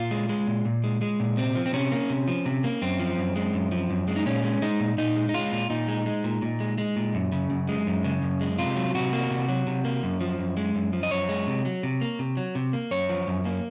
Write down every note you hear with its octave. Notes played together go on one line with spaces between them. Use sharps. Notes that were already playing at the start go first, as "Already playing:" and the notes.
Already playing: A#2 F4
G#3
G#3
A#2
A#2
G#3
G#3
A#2
C3 C4
F3
C4
C3 C#4
A#3
C3
F3
C3
A#3
F#2 C4
F3
F#2
G#3
F#2
F3
F#2
G#3
D#4
A#2 C#4
G#3
G#3 D#4
A#2
A#2 D#4
G#3
D#4
G#3 F4
A#2
A#2 D#4
G#3
G#3
A#2
A#2
G#3
G#3
A#2
F#2
C#3
F#2
G#3
F#2
C#3
F#2
G#3
C3 F4
F#3
C3 F#4
A#3
C3
F#3
C3
A#3
F#2
F3
F#2
G#3
F#2
F3
D#5
F#2 C#5
G#3
C3
F#3
C3
A#3
C3
F#3
C3
A#3
F#2 C#5
F3
F#2
A#3